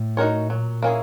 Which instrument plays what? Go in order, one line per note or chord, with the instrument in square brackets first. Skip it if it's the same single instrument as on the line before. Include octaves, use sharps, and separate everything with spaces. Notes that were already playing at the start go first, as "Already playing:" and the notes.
Already playing: [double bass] A2
[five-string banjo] D#4 F#4 A#4 C#5
[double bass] A#2 [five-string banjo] F#3
[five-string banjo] A#3 C#4 E4 G#4